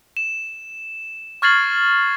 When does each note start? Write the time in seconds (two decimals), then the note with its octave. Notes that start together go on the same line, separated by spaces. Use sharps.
0.17 E7
1.42 C#6 F6 G#6 A6 C7 F#7